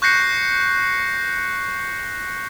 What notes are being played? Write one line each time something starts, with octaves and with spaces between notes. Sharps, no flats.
C#6 F#6 G6 A#6 C7 C#7